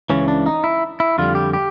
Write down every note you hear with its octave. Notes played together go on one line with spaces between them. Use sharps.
C#2 C#3 E3 C#4
D4
D#4
E4
E4
F2 D3 G3 F4
G4
G4